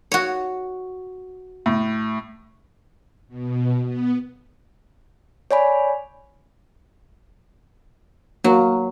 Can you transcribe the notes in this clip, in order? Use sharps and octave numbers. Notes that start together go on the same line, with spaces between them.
F#4 C#5
A2
B2
B3
C#5 D5 G#5 B5
F#3 A#3 F#4